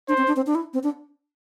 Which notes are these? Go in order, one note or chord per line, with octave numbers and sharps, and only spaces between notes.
D4 C5
C4
D4
C4
D4
E4
C4
D4